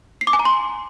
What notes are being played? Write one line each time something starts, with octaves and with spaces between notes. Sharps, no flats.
C7
D6
G#5
A#5
C6